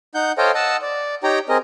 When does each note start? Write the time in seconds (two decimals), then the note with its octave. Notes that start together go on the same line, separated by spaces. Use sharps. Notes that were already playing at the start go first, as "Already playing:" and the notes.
0.15 D#4 F#5 G6
0.38 A4 C5 C#5 D#5 F5 G5
0.55 D#5 F#5 A5 E6
0.82 D5
1.23 D#4 G4 C#5 G5 A#5
1.49 C4 G#4 A#4 D#5